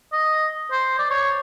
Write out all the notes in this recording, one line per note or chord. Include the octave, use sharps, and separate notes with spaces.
D#5
C5
D5
C#5